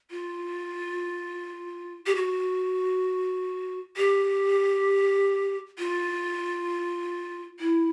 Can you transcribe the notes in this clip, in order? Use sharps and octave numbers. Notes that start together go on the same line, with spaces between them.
F4
G4
F#4
G4
F4
E4